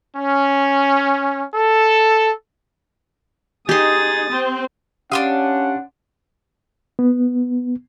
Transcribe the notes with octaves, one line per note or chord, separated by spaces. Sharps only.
C#4
A4
D#4 G4 G#4 C6 D#6 A6
C4 C5
C#4 D4 G4 F5 F#5 C6 D#6
B3